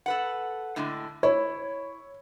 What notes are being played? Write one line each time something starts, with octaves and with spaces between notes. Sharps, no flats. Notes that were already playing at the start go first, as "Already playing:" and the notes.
A4 B4 F#5
A2 D3 G#3
E4 C#5